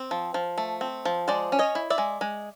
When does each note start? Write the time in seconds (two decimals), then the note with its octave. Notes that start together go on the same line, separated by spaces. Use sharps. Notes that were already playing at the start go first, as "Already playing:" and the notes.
Already playing: C4
0.11 F3
0.34 F3
0.58 A3
0.81 C4
1.05 F3
1.28 G#3 C5 D5
1.52 C#4
1.59 C#5 D#5
1.75 E4
1.90 D5 E5
1.98 G#3
2.21 G#3